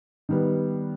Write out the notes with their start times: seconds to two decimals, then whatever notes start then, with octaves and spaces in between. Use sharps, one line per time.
0.29 D#3 G3 B3